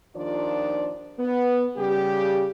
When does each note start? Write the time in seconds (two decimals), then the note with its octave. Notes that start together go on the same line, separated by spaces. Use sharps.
0.15 D#2 D#3 F3 D4 F4 D5
1.19 B3
1.77 C#3 G3 G4